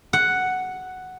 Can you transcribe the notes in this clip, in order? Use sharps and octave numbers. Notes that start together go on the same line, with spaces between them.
F#5